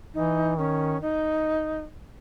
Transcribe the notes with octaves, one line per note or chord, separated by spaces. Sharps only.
E3 D#4
D#3 C#4
D#4